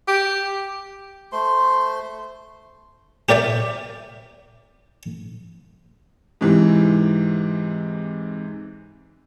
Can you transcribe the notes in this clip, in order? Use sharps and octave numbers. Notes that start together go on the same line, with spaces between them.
G4
A3 C5 C6
G4 A#4 D5 E5 G5
G#2 C3 E3